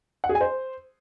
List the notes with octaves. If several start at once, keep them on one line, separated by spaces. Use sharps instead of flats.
F#5
G#4
G#5
C5